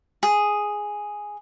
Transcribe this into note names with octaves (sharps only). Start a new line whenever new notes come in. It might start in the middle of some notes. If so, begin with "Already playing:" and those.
G#4